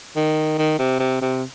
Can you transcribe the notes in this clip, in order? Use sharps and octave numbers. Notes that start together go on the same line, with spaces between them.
D#3
D#3
C3
C3
C3